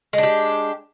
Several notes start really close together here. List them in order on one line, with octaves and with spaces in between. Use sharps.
G#3 D4 G4